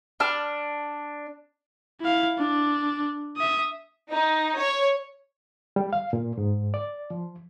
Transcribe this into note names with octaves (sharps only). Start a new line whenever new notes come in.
D4 A5 F6
E4 F5
D4
E5 D#6
D#4
C#5
G3
F5
A#2
G#2
D5
F3